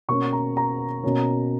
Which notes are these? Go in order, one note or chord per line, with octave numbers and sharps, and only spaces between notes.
B2 A#3 C#4 C#6
A#5
A#5
B2 A#3 C#4